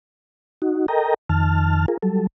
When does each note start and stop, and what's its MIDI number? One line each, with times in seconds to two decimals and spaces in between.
0.62 0.86 63
0.62 0.86 66
0.88 1.14 69
0.88 1.14 70
0.88 1.14 75
0.88 1.14 79
0.88 1.14 82
1.29 1.86 41
1.29 1.86 51
1.29 1.86 81
1.29 1.86 89
1.88 1.97 65
1.88 1.97 68
1.88 1.97 70
2.03 2.27 54
2.03 2.27 55
2.03 2.27 69